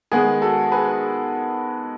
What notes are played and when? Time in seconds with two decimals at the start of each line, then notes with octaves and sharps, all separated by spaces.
0.12 D#3 G#3 B3 G#4
0.41 F#4 A4
0.72 G#4 B4